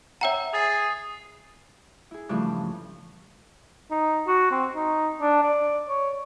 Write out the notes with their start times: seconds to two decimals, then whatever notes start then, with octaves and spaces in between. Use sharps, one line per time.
0.21 C#5 E5 F#5 G5 A#5
0.53 G#4 D#6 A6 C7
2.11 E4 G#4
2.29 G2 C#3 E3 F3 A3
3.91 D#4
4.27 F#4
4.51 C4
4.75 D#4
5.21 D4
5.43 D5
5.89 C#5